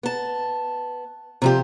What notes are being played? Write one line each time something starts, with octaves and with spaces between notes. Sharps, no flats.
B3 A5
C3 F3 G4